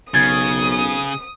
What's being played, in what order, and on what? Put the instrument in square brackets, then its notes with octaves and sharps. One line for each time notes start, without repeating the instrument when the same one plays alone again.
[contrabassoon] B1 [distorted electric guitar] C#3 [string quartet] D#6 [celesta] G#6 A6